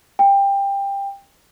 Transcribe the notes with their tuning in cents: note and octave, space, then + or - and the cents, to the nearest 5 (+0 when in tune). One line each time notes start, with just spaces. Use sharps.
G5 +20